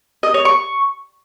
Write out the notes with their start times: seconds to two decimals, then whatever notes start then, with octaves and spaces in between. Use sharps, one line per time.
0.23 D#5
0.34 C#5
0.45 C#6